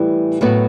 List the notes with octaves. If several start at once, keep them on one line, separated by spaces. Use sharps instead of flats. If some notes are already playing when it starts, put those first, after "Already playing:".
Already playing: A2 E3 G3
A2 F#3 B3 F#4